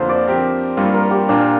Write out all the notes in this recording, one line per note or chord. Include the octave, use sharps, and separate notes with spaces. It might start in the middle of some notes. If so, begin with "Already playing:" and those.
Already playing: F2 D3 A#3 D4 F4 C5
D5
F3 C4 G4 A#4
G2 G3 A#3 F4 D5
A#4
G4
A#2 A#3 D4 F4